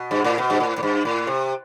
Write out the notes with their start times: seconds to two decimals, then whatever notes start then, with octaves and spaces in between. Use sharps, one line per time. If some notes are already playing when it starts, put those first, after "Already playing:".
Already playing: B2
0.11 G2
0.24 A2
0.38 B2
0.50 G2
0.60 A2
0.78 A2
0.83 G2
1.05 A2
1.27 C3